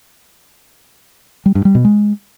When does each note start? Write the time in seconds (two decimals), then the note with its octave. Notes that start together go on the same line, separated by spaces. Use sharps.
1.46 G3
1.55 G2
1.65 G3
1.75 B2
1.85 G#3